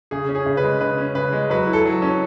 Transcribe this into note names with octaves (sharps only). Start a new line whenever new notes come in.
C#3 G#4
C#4
G#4
C#3
B4
G#3
C#3 B4
C#4
C#3 B4
G#3
F#3 B4
E4
A4
F#3
C#4